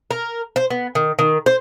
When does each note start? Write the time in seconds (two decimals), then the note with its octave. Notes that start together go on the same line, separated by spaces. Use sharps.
0.11 A#4
0.56 C5
0.70 B3
0.95 D#3
1.19 D#3
1.46 C5